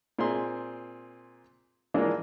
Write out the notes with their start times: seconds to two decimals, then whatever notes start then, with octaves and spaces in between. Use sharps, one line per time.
0.19 A#2 C4 G#4 C6
1.94 G#2 E3 F3 G#3 A#3 D4